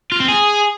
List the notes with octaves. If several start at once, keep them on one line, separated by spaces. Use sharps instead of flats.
F4
C4
G#4